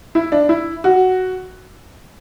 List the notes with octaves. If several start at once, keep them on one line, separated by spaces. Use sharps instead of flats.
E4
D4
E4
F#4